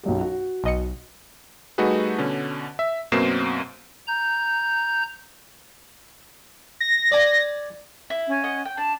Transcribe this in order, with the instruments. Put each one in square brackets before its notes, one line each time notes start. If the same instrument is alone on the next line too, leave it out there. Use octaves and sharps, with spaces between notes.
[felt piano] B1 F#2 G4
F#4
[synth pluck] B1 D#5 C#7
[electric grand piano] G3 A3 D#4 F#4 G#4 B4
B2 D3 C#4
E5
F#2 B2 A#3 C4 C7 E7
[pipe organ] A#5 G6
[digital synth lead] A#6
[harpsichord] D5 G#5
[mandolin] E4
[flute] C#4
[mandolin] D#5 F#5
G5
[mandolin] D4 [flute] A5